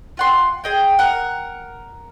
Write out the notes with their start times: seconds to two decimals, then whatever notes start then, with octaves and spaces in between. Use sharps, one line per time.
0.17 F4 F#5 C6
0.64 G#4 D#5 G5
0.99 A#4 F#5